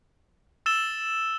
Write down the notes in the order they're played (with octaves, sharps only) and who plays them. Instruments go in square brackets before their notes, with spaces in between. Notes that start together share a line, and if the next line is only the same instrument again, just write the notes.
[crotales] E6 A6 E7 G7